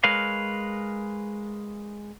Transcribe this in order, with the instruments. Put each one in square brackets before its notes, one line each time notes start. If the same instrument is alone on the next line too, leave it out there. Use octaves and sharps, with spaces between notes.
[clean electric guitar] G#3 A#4 B4 C#5 F5